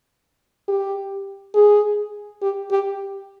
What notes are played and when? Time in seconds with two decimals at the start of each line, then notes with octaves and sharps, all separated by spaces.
0.68 G4
1.55 G#4
2.42 G4
2.71 G4